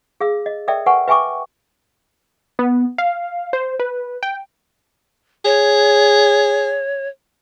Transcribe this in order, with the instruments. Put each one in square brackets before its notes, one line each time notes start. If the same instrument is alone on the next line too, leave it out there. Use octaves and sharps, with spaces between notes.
[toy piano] G#4 F5 E6
D#5
A4 A#4 D5 E5 G5
A#4 B4 F#5 G#5 C#6
B4 E5 G5 G#5 C#6 D6
[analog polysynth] B3
F5
C5
B4
G5
[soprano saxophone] G#4 [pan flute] C#5